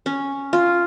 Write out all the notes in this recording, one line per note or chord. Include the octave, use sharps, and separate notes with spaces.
C#4
F4